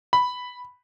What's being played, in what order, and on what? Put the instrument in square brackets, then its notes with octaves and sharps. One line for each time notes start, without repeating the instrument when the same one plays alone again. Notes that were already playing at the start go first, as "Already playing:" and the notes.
[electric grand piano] B5